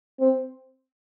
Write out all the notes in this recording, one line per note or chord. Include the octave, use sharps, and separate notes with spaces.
C4